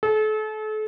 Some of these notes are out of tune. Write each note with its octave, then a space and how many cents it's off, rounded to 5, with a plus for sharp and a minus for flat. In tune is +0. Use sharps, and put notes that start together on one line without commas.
A4 -40